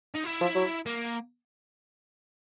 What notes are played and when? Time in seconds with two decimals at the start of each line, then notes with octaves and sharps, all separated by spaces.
0.15 D#4
0.25 E4
0.41 F3
0.55 F#3
0.86 A#3